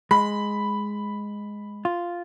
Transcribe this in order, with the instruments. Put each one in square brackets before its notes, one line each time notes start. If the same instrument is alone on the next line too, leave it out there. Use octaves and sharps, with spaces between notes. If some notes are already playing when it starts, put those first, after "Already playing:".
[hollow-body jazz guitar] G#3 [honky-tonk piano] B5
[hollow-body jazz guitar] F4